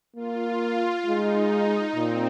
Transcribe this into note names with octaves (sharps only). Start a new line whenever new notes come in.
A#3 F4
G#3 D#4
A#2 C4